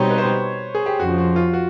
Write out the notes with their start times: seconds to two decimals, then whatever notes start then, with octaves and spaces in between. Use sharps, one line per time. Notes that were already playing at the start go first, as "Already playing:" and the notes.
Already playing: B2 G3 C4 D#4 G4 C#5
0.10 B4
0.18 C5
0.75 G#4
0.86 G4
1.00 F2 C#3 F3 F#4
1.18 F#4
1.36 F4
1.53 F#4